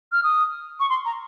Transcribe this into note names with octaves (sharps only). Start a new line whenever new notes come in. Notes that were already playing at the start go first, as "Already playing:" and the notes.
F6
D#6
C#6
C6
A#5